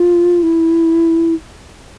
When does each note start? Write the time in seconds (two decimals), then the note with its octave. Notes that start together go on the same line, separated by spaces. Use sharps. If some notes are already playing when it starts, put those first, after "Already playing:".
Already playing: F4
0.43 E4